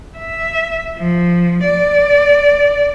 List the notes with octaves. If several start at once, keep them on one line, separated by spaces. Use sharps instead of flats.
E5
F3
D5